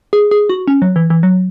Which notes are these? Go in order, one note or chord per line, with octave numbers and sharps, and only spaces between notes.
G#4
G#4
F#4
C#4
F#3
E3
E3
F#3